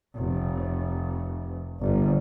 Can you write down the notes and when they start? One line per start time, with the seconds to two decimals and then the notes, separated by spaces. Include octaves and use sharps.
0.16 F1
1.80 G1